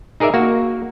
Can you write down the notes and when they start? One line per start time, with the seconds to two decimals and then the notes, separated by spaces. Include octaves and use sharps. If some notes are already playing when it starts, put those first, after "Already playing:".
0.20 D#4 G#4 A#4 D5 E5
0.34 A#3 F#4